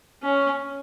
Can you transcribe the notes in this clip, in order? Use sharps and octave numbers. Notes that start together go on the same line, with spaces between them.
C#4